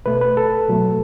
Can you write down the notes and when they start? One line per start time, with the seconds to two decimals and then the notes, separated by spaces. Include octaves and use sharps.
0.06 B2 A3 B4
0.21 B4
0.37 A4
0.68 B2 F#3 A3